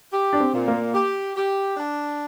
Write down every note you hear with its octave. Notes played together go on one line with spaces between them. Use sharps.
G4
D4
C4
A#2
A#3
G4
G4
D4